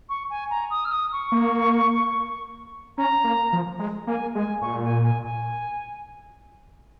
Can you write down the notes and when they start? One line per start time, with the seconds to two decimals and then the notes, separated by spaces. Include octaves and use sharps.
0.09 C#6
0.30 G#5
0.50 A#5
0.70 D#6
0.85 F6
0.91 D#6
1.12 C#6
1.32 A#3
2.97 C#4 A#5
3.24 A#3
3.53 F3
3.79 G#3
4.07 A#3 G#5
4.35 G#3 G#5
4.61 A#2 C#6
4.83 G#5
5.03 G#5
5.24 G#5